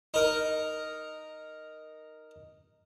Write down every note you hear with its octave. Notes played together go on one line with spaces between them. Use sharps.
D#4 A#4